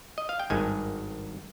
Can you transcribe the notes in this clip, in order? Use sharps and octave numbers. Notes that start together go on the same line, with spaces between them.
D#5
F5
G5
G#1 G2 D#3 G#3 G#5